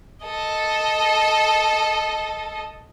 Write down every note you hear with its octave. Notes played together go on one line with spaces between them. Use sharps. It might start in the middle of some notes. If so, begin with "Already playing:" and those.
A4 D#5